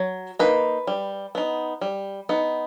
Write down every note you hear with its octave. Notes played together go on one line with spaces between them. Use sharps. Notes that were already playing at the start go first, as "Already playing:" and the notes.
Already playing: F#3
A#3 D#4 B4
G3
B3 D#4
G3
B3 D#4